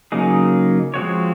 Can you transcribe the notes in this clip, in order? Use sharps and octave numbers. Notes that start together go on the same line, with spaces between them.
C#3 F#3 A#3 D#4 G#4
F3 G#3 C4 F#4 C#5